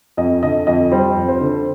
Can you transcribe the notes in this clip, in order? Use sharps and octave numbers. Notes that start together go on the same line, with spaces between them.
F2 D#5
D3 D#5
F2 D#5
G3 C5
F2
C5
D3